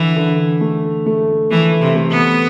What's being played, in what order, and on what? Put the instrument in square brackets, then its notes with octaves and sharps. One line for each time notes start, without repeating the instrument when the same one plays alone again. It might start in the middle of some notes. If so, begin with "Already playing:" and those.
Already playing: [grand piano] D3 [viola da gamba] E3
[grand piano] D3
A3
A3
[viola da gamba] E3 [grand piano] A3
[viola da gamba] C3
[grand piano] A3
[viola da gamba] B3